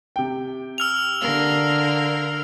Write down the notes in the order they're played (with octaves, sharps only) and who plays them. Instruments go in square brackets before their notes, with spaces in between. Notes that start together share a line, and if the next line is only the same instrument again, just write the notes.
[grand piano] C3 G5
[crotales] E6 F6 F7
[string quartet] D3 A#4 F5